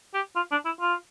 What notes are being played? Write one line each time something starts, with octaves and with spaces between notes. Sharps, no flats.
G4
F4
D4
E4
F4